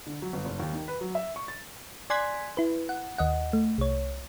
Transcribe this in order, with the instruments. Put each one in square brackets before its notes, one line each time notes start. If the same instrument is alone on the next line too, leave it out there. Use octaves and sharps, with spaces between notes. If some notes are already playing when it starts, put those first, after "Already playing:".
[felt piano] D3
F#3
G1
F#1
D#2
D#3
B4
F#3
E5
C#6
A6
[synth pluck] D5 G#5 C6 F#6 G#6 B6
E4 B4
F#5
D#2 D#5 F#5
A3
C2 C#5